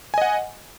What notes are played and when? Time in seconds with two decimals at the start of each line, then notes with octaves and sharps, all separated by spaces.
0.14 G#5
0.18 D#5
0.22 F#5